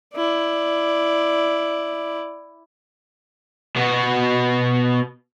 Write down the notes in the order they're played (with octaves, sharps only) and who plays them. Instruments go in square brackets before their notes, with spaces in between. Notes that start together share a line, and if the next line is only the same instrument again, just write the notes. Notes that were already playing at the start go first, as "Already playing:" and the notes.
[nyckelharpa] E4 D5
[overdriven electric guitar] B2 F#4